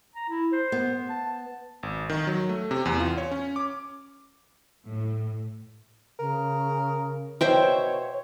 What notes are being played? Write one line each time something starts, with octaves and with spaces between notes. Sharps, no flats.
A#5
E4
C5
B3
A5
G#1
D#3
F#3
A3
C3
E2
F4
C#5
C#4
D6
A2
C#3 A#4
B2 C5 C#5 E5 G5